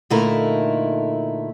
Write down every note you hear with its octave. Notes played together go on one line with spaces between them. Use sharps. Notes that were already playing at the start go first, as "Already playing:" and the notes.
A#2 D3 A3 D#4 E4 A#4